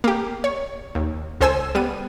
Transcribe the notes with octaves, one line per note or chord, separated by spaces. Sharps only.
A#3 G4
C#5
D#2
C#2 A4 C5 G#5 E6
G3 B3 D#7